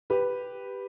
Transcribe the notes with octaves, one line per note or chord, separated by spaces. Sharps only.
G4 B4